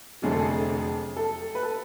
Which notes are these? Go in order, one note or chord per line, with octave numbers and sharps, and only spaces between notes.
F1 F2 D3 F#3 A3 G#4
A4
G#4
A4
B4
A4